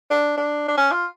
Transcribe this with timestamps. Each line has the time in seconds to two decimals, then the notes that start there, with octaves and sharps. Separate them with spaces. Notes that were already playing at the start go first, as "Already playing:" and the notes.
0.11 D4
0.37 D4
0.68 D4
0.77 C#4
0.92 F4